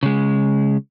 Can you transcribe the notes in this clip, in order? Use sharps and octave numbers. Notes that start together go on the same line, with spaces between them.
C#3 G#3